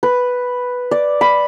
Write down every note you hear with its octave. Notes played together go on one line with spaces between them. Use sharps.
B4
D5
B5